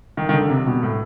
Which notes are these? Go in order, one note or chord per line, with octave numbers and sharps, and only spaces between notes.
D#3
D#3
D3
C3
B2
A2